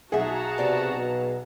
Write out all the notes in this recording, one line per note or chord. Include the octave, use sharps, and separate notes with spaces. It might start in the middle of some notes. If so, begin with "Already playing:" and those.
B1 F#4 G#4 E5 F#5 A5 A#5
C3 B3 D5
B2